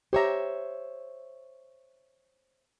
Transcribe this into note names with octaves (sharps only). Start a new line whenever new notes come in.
G4 C5 C#5 E5 A#5